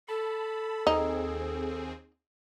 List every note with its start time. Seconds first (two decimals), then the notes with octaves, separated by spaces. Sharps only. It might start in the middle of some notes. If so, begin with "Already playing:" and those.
0.08 A4 A5 B5
0.87 D#2 C4 D#4 G#4